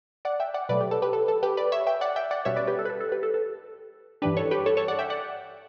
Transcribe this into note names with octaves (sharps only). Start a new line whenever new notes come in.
D5 F#5
E5 G5
D5 F#5
B2 F#3 A3 B4 D5
G4
A4
G4 B4
A4
A4
G4 B4
B4 D5
C#5 E5
E5 G5
D5 F#5
E5 G5
D5 F#5
B2 G3 C#4 C#5 E5
B4 D5
G4 B4
A4
B4
A4
A4
G4 B4
A4
A4
G2 E3 G3 D4 G4 B4
A4 C#5
G4 B4
A4 C#5
A4 C#5
D5 F#5
E5 G5
D5 F#5